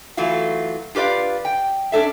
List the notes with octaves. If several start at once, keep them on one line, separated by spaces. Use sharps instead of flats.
E3 F#3 A3 F4 F#4
F4 G4 B4 D5 F5
G5
C#4 D4 A4 E5